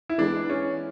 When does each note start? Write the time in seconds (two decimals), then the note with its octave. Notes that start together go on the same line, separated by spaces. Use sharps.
0.09 E4
0.18 E3 G#3 B3 D4
0.50 C#4